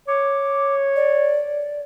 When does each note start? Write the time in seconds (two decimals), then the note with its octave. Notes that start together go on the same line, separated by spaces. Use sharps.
0.08 C#5 D6
0.96 D5